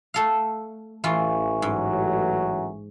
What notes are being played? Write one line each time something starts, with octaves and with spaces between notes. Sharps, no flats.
A3 A4 F5
A1 E3 F4 E5 G#5 C#6
G#2 F#3